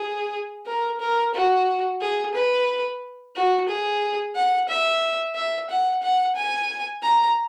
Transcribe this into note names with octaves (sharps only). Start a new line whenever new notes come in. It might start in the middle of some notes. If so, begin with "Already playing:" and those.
Already playing: G#4
A#4
A#4
F#4
G#4
B4
F#4
G#4
F#5
E5
E5
F#5
F#5
G#5
A#5